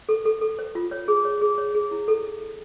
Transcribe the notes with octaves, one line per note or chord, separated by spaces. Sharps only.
A4
A4
A4
C5
F4
C#5
G#4
C#5
G#4
C#5
G#4
E4
A4